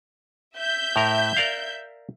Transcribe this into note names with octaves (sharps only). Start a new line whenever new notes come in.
E5 G6
A2 A#4
A#4 D5 F5